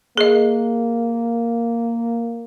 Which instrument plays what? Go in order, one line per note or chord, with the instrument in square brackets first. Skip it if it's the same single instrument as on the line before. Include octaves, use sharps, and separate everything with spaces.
[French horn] A#3 [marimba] G#4 D#5